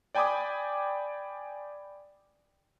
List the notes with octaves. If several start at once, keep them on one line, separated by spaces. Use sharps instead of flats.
D5 G5 G#5 B5 D6 D#6